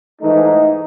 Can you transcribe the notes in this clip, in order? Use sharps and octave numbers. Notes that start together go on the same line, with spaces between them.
G#2 E3 A3 D#4